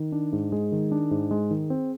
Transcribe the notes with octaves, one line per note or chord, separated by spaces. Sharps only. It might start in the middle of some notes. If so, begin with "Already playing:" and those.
Already playing: D#3
D4
G#2
G#3 G#4
D#3
D4
G#2
G#3
D#3
C4